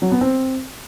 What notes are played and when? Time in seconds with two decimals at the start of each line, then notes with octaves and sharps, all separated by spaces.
0.02 F#3
0.12 B3
0.21 C4